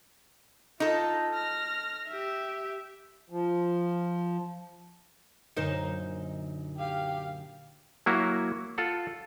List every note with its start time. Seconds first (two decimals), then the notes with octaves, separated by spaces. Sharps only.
0.80 D#4 F4 A4
1.34 F6 A#6
2.08 G4 E5
3.30 F3
5.57 F#2 A#2 D3 D#4 A#4 C5
6.77 G4 F5
8.06 F#3 A#3 E4 F#4
8.78 F4 A4 F#5